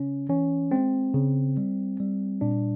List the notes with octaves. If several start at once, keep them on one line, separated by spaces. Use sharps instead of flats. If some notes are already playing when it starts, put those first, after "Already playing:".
Already playing: C#3 C#4
E3 C#4
G#3 C4
C#3
G3
G3
A#2 D4